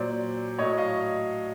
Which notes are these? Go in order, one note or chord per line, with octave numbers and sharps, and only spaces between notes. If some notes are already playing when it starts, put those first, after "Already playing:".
Already playing: A#2 F#3 C5 D5
A2 F#3 C#5 D#5
D#5 F5